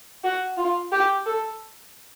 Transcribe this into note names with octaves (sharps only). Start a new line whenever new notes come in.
F#4
F4
G4
A4